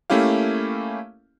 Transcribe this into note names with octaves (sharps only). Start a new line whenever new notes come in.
A3 A#3 C#4 E4 G4 F5